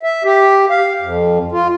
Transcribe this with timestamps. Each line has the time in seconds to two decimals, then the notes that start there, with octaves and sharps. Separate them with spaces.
0.03 E5
0.24 G4
0.70 F5
1.02 F2
1.52 F4